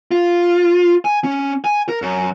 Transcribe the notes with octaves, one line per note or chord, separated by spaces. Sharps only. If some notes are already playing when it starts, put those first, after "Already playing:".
F4
G#5
C#4
G#5
A#4
F#2